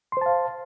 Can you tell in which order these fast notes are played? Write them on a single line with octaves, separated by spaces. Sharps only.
C6 C5 A5 F5